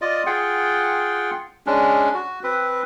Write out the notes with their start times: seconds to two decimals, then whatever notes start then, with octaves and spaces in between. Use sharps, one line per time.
0.01 F4 D5 D#5
0.26 F4 G#4 F#5 G5
1.66 G#3 C#4 D4
2.14 F#4
2.44 C4 B4